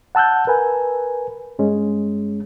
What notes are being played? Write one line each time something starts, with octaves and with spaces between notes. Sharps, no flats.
F#5 A5 E6 F#6 G6
A#4 B4 G#5
G2 G#3 C#4